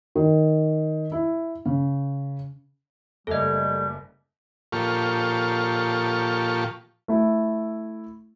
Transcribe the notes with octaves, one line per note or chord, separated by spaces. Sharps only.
D#3
E4
C#3
F#1 G3 A3 A4 D#5
A#2 F3 F4 G4 A4 C#6
A3 E4